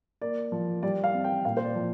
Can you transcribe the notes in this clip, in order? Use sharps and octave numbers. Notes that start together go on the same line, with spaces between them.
A#3 D5
F3
G3 D5
F5
C4
G5
A#2 F5
C5
D5
F3